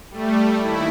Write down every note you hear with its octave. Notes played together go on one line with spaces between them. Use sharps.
G3 A3
D#2 E4